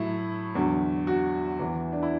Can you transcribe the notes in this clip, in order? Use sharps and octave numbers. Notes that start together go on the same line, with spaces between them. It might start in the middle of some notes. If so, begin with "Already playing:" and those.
Already playing: A2 F#3 E4
E2 D3 F#3
F#4
E2 E3
D4
E4